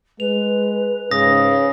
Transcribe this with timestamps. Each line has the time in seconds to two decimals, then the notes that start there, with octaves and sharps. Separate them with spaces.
0.20 G#3 B4 F7
1.11 G#2 C#3 D#6 A#6